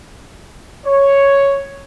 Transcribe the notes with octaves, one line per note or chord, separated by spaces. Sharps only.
C#5